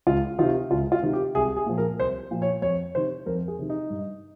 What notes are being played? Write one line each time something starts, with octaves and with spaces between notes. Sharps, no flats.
C#2 F4
C3 D#3 F4
C#2 F4
F4
C3 D#3
G4
C2 G#4
G#4
A#2 F3
A#4
C2 C5
A#2 F3
C#5
F2 C#5
C3 D#3 C5
F2 A#4
G#4
C3 D#3
D#4
G2